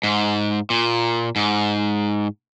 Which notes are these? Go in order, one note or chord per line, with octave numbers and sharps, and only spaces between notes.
G#2
A#2
G#2